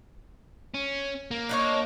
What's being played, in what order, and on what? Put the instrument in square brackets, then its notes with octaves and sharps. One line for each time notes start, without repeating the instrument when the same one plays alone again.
[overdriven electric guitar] C#4
A#3
[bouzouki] D4 D#4 C#5